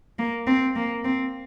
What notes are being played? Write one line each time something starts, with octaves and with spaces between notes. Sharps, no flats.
A#3
C4
A#3
C4